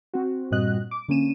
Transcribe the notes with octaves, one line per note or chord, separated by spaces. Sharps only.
C4 F#4
G2 A#2 C4 F#4 D#5 F#6
D6
D3 A#3 C#4 D#7 E7